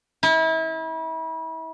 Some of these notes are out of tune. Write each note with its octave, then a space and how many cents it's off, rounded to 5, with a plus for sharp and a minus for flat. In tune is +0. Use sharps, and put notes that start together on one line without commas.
E4 -35